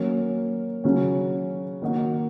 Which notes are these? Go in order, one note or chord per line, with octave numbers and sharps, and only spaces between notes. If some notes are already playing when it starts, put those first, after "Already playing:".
Already playing: F#3 A#3 C#4 F#4
C#3 F#3 C#4
D#3 A#3 D#4 F#4